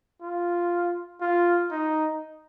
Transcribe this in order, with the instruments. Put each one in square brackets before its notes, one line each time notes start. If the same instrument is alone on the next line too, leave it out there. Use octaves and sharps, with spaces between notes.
[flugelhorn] F4
F4
D#4